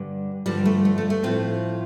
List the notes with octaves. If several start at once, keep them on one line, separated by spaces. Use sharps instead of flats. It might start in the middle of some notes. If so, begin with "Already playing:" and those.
Already playing: G2 D3 G3
G2 D3 F3 G3
A3
A3
A3
A3
A2 F3 C4 F4